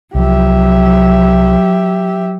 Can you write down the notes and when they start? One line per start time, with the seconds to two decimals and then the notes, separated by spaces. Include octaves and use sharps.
0.15 C2 F3 F#3 G4 E5